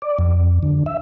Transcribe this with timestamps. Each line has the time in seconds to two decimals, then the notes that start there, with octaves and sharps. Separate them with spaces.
0.02 D5
0.19 F2
0.63 D3
0.86 E5